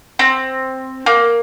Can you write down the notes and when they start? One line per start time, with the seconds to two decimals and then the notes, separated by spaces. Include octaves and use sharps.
0.19 C4
1.06 A#3